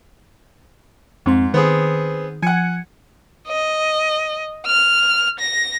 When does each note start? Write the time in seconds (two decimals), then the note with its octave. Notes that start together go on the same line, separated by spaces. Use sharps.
1.26 F2 G#2 C4 C6
1.54 D#3 B3 C4 G#4
2.42 F3 F#5 G#5 G#6 C#7
3.48 D#5
4.67 F6
5.40 A#6